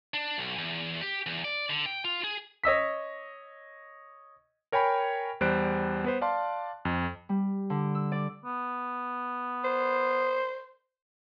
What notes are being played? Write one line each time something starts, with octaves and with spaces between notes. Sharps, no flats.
D4
B1
E2
G4
E2
D5
D3
G5
F4
G#4
C#5 D#5 E6 B6
A#4 C#5 G5 G#5 B5
E2 G3 C5 F#6 D7
B3 B4 C5
D5 F5 A5 C6
F2
G3
D3
E6
D5
B3
C5